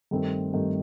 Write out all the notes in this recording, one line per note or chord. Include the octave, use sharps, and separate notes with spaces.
G2 D#3 A3 C4
G2 D#3 A3 C4